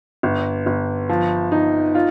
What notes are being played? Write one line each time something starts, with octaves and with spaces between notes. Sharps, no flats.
G1
G1
F3
D#4
F4